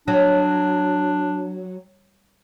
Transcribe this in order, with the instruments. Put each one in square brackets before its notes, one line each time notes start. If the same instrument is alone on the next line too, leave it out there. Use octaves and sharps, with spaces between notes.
[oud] F#3 [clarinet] D4